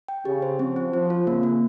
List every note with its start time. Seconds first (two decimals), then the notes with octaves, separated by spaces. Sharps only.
0.08 G5
0.25 C#3 G4
0.42 C5
0.59 F3 C4
0.76 C4
0.93 F3 C4
1.10 F4
1.26 C#3 A#3
1.43 A#3